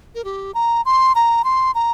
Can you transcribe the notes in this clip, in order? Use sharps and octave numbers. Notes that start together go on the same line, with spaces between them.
A#4
G4
A#5
C6
A#5
C6
A#5